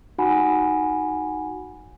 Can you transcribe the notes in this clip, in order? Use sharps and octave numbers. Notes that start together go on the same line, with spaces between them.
D#4 F#4 F#5 G#5 B5